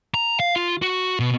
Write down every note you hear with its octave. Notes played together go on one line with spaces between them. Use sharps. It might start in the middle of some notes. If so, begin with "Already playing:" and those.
A#5
F5
F4
F#4
B2